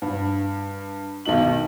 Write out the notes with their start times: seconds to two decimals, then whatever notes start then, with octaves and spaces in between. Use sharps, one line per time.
0.02 G2
1.25 B1 D#3 D#4 F#7